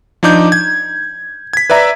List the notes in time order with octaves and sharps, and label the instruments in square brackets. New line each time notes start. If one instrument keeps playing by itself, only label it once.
[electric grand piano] F3 D4 D#4 D6 G6
G#6
G#6 B6
B4 D5 E5 A#5